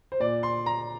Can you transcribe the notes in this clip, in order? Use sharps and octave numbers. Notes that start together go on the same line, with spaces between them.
C5
A#2 D5
C6
A#5